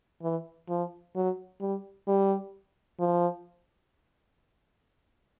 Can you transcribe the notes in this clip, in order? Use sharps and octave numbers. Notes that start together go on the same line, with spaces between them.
E3
F3
F#3
G3
G3
F3